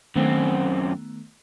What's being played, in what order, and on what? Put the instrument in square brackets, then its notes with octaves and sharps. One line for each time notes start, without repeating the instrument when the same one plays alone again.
[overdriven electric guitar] F#2 C4 [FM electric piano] D#3 A3 B3